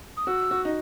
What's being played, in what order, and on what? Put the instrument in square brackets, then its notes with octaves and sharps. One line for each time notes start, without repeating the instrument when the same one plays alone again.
[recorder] D#6
[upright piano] F#4 [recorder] E6
[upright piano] F#4
D#4